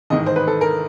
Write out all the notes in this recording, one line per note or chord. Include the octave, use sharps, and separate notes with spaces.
A1 G#2 D#3 D#5
C5
B4
A4
A#4